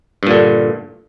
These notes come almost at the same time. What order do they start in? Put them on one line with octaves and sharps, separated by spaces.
G2 A#2 D3